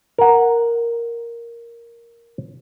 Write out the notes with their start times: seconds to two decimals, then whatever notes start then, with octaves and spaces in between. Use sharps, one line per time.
0.18 A#4 F#5